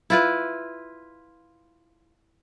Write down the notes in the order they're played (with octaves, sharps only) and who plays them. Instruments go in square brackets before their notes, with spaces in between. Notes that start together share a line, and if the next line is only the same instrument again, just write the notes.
[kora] E4 F4 B4